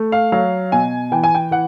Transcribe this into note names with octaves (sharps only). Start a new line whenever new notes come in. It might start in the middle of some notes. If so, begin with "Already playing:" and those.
Already playing: A3
F5
F#3 F5
B2 G#5
E3 G5
G#5
G5
E3 F#5